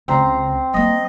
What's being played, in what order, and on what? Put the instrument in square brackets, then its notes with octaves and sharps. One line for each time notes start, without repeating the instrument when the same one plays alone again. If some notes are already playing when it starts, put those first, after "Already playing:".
[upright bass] C#2 C#3 [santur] C4 F5 A#5
[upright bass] G3 A#3 [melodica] D#5